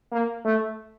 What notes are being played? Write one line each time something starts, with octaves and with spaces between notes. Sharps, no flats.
A#3
A3